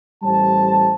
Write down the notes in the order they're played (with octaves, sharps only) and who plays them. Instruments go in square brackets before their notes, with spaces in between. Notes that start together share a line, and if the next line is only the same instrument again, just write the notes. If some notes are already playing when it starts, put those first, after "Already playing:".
[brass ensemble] A1 G3 C5 A5